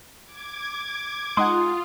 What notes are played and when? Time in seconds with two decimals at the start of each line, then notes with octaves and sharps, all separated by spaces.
0.25 D6 G#6
1.37 G#3 D#4 F4 F#5 C6 D#6